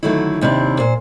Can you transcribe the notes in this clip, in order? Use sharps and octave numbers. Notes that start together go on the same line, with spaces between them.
D3 D#3 F#3 A3 E4
D#2 C3 D4 E4
A#2 C5